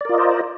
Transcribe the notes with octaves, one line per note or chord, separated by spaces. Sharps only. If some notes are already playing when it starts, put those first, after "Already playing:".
F4 A#4 C5 D5 D#5